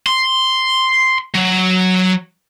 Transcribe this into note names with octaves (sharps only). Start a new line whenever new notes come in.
C6
F#3